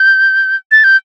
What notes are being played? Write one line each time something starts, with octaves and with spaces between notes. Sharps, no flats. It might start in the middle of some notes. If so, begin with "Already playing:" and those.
Already playing: G6
A6
G6